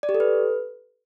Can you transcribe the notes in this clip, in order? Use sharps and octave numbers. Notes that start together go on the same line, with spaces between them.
D5
G4
A4
B4